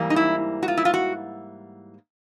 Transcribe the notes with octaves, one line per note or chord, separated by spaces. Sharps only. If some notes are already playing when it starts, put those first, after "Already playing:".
Already playing: G#2 E3 G3 A#3
D#4
E4
F#4
F4
E4
F4
F#4